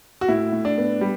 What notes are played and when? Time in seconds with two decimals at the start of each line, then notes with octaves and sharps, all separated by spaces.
0.21 F#4
0.28 A2 E4
0.52 A2
0.65 D4
0.78 B3
1.01 G3